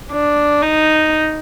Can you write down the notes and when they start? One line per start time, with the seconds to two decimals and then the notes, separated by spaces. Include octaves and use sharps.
0.12 D4
0.62 D#4